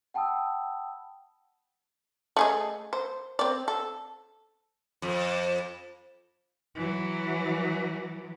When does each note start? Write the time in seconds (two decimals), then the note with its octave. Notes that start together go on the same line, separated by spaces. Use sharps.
0.14 F#5 G5 A5 B5 D#6 E6
2.37 A3 G#4 D#5
2.93 C5
3.39 C4 D5
3.68 A4
5.02 F2
6.76 E3 F#3